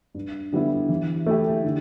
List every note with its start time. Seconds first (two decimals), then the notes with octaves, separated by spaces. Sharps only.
0.15 G2
0.53 D3 G3 B3 E4
0.89 E3
1.26 A3 E4 G4
1.64 D3